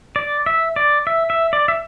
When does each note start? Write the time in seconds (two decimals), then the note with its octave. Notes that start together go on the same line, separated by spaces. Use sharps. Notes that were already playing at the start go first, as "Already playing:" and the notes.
0.16 D5
0.46 E5
0.76 D5
1.07 E5
1.30 E5
1.53 D5
1.68 E5